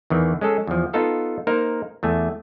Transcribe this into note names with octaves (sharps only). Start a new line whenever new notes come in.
E2 D#3 E3
G#3 C#4 G#4 A4
E2 F3
B3 D#4 F4 A4 F5
A#3 D#4 A#4 C5
E2 A3 G#5